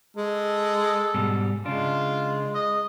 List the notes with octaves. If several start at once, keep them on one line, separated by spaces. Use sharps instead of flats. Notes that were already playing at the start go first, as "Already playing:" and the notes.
G#3 A4
G#2 B2 G3
C#3 G#3 D4 F4
D#5